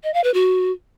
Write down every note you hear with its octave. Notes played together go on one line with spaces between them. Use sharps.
D#5
F5
B4
F#4